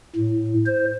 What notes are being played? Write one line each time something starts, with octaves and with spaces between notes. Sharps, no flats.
A2
C5